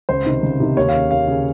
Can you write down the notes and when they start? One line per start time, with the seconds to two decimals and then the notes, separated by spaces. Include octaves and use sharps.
0.09 C#2 C5
0.26 C3 D#3
0.43 C#2
0.60 C3 D#3
0.77 D#2 C#5
0.89 F5
0.94 C#3
1.11 D#2 F5
1.28 C#3